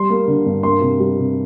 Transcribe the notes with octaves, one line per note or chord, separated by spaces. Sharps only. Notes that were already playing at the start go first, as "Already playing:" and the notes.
Already playing: G3 C6
A#3
D3
G2
A#3 C6
C3
G3
C3